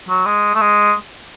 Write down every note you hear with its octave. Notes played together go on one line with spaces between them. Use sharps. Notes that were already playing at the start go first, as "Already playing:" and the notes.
F#3
G#3
A3
G#3